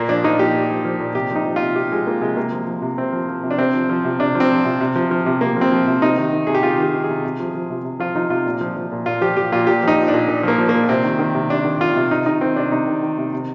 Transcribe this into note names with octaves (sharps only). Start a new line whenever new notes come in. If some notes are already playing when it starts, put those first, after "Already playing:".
Already playing: A#2 A#3
F3 D4
F3 D#4
A#2 G4
A#2
F3
F3
A#2
C3 G4
F3 D#4
F3
C3 F4
C3 G4
F3 G#3
F3 A#3
C3 G#3
C3 A#3
F3
F3
C3
C3 C4
F3
F3
C3
D4
C3 C4
F3
F3
C3
C3 D4
F3
C4
F3
C3
C3
F3
F3
C3
C3 A#3
F3 C4
F3
C3
C3 D#4
D#3
D#3
C3 G#4
G4
C3 F4
D#3 G4
D#3
G#4
C3
C3
F3
F3
C3
C3
F3 F4
F3 D#4
C3 F4
A#2
F3
F3
A#2
A#2 F4
F3 G4
F3 G4
A#2 F4
A#2 G4
F3 D#4
F3
D4
A#2
A#2
F3 A#3
F3
A#3
A#2
C3 C4
D#3
D#3
C3
C3 D4
D#3
D#3 F4
C3
C3 D#4
D#3 D#4
D#3 C4
C3 D4
C3 D#4
D#3
D#3
C3
C3